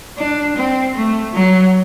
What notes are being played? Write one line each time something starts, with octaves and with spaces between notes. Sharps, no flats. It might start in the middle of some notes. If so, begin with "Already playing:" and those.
D4
C4
A3
F#3